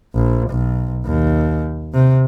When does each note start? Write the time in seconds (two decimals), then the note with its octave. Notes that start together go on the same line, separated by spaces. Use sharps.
0.15 A#1
0.50 B1
1.06 D#2
1.94 C3